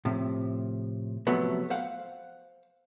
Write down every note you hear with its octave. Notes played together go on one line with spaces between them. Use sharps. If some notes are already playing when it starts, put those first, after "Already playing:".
A2 C3 F3
C3 F3 F#3 A3 B3
C5 F5 F#5